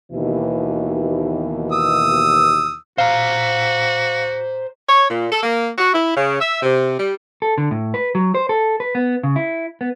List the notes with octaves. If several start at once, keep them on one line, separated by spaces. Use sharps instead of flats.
D#2 B2 E3
D#6 E6
F#4 C5 F5 A#5
C#5
A#2
A4
A#3
F#4
E4
C#3
E5
C3
G3
A4
D3
A2
B4
F#3
C5
A4
B4
B3
C#3
E4
B3